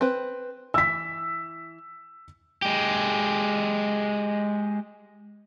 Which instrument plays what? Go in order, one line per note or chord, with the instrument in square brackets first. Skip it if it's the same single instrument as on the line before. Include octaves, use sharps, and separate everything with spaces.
[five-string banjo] C4 B4
[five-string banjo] E3 [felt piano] E6 B6
[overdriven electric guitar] G#3 G4